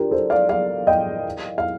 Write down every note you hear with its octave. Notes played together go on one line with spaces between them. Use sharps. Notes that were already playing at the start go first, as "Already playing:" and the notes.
Already playing: D4 F4 G4 A#4
A4 C5
D5 F5
D5 F5
D#5 G5
F5